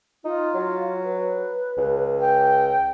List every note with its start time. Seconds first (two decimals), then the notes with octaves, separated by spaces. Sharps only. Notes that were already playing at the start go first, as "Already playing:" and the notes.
0.25 D#4 F4
0.55 F#3
1.03 B4
1.78 C#2
2.20 G5